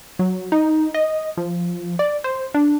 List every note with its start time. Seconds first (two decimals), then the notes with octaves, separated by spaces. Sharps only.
0.19 F#3
0.52 D#4
0.94 D#5
1.37 F3
1.99 D5
2.24 C5
2.54 D4